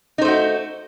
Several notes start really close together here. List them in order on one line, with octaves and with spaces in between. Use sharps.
D#4 C5 A3 F#4